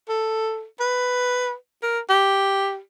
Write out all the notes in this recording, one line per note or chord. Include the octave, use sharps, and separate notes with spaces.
A4
B4
A#4
G4